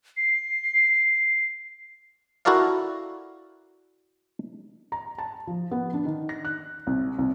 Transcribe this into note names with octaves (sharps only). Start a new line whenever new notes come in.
C7
E4 F#4 A4 A#4 D5 F5
A#5
A5
F3
B3
D4
D#3
A#6
F#6
C2
C2